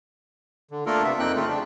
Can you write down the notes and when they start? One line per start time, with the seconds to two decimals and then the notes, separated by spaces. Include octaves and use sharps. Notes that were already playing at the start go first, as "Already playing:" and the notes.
0.71 D3
0.86 A3 A#3 D4 F4 A4 A#4
1.04 C3 B3 E5
1.19 F2 A#3 C4 D#4 G5 F#6
1.35 C#3 A3 F4
1.48 D4